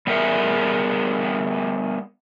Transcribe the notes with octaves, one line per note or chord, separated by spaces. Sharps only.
G3 B3 G#4 A#4 E5 F#5